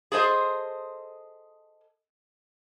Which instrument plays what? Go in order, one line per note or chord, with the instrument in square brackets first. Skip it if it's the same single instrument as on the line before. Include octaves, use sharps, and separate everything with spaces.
[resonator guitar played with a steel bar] G#4 A4 C5 D#5